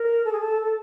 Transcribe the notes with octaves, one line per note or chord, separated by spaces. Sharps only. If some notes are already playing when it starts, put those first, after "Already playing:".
Already playing: A#4
A4
G#4
A4
A4